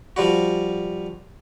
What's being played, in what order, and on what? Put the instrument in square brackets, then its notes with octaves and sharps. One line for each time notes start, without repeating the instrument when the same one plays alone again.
[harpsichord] F3 G3 F#4